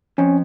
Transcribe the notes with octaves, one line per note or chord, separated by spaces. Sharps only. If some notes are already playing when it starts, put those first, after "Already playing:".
F2 C#4